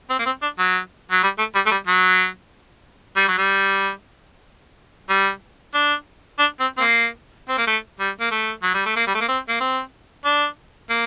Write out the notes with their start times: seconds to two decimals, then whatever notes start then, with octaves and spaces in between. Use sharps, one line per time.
0.10 C4
0.19 A#3
0.26 C4
0.42 D4
0.59 F#3
1.11 F#3
1.23 G3
1.39 A3
1.55 G3
1.66 A3
1.71 G3
1.87 F#3
3.16 G3
3.28 F#3
3.38 G3
5.09 G3
5.74 D4
6.39 D4
6.60 C4
6.77 C4
6.81 A#3
7.49 C4
7.58 A#3
7.67 A3
8.00 G3
8.21 A#3
8.31 A3
8.63 F#3
8.74 G3
8.86 A3
8.96 A#3
9.07 G3
9.15 A3
9.21 A#3
9.28 C4
9.49 A#3
9.60 C4
10.25 D4
10.90 A#3